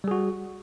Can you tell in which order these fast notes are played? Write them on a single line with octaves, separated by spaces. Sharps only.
G3 G#4 F#4